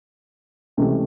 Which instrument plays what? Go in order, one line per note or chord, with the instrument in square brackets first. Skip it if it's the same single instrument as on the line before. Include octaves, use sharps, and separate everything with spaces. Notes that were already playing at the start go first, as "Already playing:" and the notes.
[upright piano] C#2 C3 E3 A3 C#4